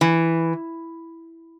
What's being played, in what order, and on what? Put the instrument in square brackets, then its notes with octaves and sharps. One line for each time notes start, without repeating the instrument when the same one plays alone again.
[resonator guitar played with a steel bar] E3